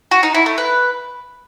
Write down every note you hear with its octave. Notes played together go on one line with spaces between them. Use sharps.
F#4
D#4
E4
A3
B4